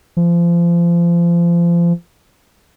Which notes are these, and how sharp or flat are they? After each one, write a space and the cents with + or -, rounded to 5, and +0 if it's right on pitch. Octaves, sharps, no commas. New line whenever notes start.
F3 -30